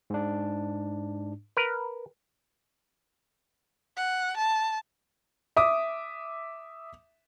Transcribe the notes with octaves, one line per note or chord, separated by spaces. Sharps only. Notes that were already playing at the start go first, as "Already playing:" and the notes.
G#2 D4
A#4 B4
F#5
A5
E5 D6 D#6